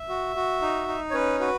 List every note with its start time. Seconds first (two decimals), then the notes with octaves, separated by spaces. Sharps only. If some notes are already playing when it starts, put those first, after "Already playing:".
Already playing: E5
0.09 F#4
0.36 F#4
0.62 D#4
0.88 D#4
1.10 C#5
1.14 C#4 B4
1.40 F#4 B4